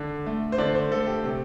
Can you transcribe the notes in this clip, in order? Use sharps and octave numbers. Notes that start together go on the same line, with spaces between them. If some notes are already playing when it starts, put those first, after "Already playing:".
Already playing: D3
A3
C5
D3 D5
C5
A3 A4
G4
C3